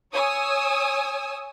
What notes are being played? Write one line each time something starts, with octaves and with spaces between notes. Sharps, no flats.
C#5 G#5 D#6 E6